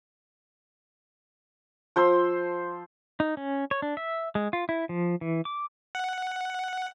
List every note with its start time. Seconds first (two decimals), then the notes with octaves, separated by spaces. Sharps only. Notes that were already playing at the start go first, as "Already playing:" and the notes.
1.96 F3 C5 C6 E6
3.20 D#4
3.37 C#4
3.71 C#5
3.82 D4
3.97 E5
4.35 G#3
4.53 F4
4.69 E4
4.89 F3
5.21 E3
5.45 D6
5.95 F#5